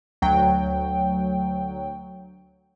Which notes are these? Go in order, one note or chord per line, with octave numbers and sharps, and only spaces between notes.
D2 F#3 G5